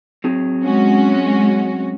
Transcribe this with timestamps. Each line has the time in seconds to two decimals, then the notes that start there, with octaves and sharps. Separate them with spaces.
0.24 F#3 C4 G#4
0.63 G#3 C#4 F#4